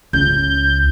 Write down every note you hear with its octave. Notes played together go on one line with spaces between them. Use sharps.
C#2 G6